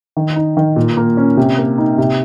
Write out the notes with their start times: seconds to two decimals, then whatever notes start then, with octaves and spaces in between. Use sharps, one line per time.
0.17 D#3
0.36 D#4
0.57 D#3
0.76 A#2
0.97 A#3
1.17 C#4
1.37 C3
1.58 A#3
1.78 D#4
1.98 C3